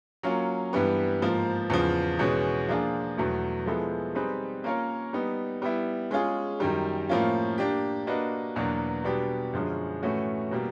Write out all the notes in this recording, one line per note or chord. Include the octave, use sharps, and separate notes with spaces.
F#3 A#3 C#4 F4
G2 E3 G3 B3
G#2 F3 A#3
E2 C#3 F3
E2 B2 G#3 C#4
F3 A#3 D4 F4 G#4
E2 B2 F#3 A3
F3 G#3 B3 E4 A4
G3 C4 D#4 G#4 B4
A#3 C#4 F4 A#4 C#5
G3 B3 D#4
G3 B3 E4
G#3 C#4 F4 G#4
F#2 D#3 G3
A2 F3 A#3 C#4 F4
A#3 D4 G4
A#3 D4 F#4 B4 D#5
E2 B2 F#3 A#3 D4
B2 G3 B3 D4 G4
F#2 D3 F3 G#3 C#4
A2 E3 A3 C#4 F#4
B2 G3 A#3